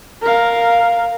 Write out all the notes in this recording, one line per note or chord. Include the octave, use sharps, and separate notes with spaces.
A#4 F5